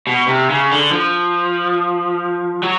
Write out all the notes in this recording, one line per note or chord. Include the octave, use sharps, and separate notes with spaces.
B2
C3
C#3
D3
F3
F#3